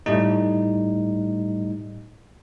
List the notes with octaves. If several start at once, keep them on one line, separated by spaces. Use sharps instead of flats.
A2 G3 A3 D#4